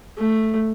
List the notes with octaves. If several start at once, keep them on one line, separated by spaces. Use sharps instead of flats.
A3